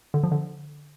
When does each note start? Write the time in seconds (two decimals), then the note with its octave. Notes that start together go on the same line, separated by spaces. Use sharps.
0.14 D3
0.23 F3
0.32 D3